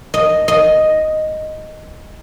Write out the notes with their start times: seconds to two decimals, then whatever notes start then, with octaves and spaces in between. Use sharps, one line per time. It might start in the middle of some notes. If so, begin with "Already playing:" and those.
0.14 D#5
0.48 D#5